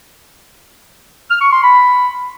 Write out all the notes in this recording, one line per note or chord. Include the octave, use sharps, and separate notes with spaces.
F6
C#6
C6
B5